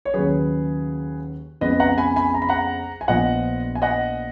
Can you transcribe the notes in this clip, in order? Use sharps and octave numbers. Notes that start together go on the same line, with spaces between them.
C#5
D#2 C#3 F#3 G#4 B4
F2 C#3 G#3 B3 B4 D#5
F#5 A#5
G#5 B5
G#5 B5
A#5
B5
F#5 A#5
G#5
A#1 A#2 F3 B3 D#5 F#5
G#5
D#5 F#5